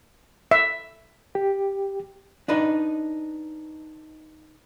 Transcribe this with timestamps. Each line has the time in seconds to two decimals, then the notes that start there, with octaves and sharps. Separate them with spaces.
0.51 E5
1.35 G4 G5
2.48 D4 D#4 B4